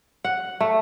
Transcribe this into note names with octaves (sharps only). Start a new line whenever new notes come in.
F#5
A3